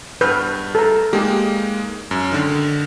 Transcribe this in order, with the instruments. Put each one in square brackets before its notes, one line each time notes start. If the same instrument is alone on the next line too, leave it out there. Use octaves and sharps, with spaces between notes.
[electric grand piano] G2 F6 G6 [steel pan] B4
[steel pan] A4 A#5
[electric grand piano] G#3 A#3 D#4 [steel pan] G4
[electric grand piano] F#2
D3 D#3